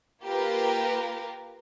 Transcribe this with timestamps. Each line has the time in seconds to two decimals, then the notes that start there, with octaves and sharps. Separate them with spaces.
0.24 A#3 F4 G4 A#4 B4